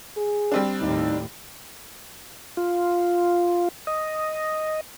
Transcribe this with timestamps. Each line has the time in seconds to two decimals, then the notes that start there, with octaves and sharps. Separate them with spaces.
0.17 G#4
0.52 G3 C4 D4
0.81 D#2 A2 D#4
2.57 F4
3.87 D#5